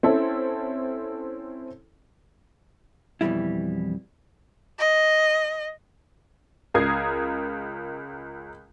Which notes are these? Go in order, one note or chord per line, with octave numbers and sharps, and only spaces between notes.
C4 C#4 E4 A4
F2 B2 D3 E3 G3 E4
D#5
C#2 A#4 A#5 D#6 G#6 C7